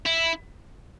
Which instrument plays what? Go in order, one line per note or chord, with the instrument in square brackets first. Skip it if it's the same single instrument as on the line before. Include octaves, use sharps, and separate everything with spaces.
[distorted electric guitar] E4